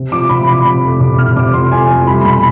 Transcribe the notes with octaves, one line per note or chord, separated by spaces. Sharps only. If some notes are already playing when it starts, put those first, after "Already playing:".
Already playing: C3
F3 D6
C3 B5
F3 B5
C3
F2
C3 D6
C3 F6
C3 D6
F2 C6
F2 G#5
F2
G3 B5
B2 B5